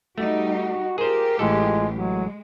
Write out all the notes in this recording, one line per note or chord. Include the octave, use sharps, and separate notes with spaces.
G3 A3 D#4 F#4 G4
F4 G4 G#4 A#4 C5
A1 A2 G#3 A4
F#3 G#3